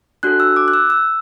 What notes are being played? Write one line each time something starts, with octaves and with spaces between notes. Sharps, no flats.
D4 F#4 A4 F#6
E6
D6
F#6
E6
E6